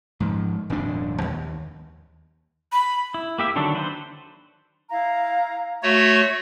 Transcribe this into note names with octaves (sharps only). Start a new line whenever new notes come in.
G#2 F3
D#1 F2 G#2 D4
D#2
B5
E4
A#3 G4 E5
D3 D#3 F#3 D4
B4 C5
E4 F5 A#5
A3 F#4 C#5 E5 C6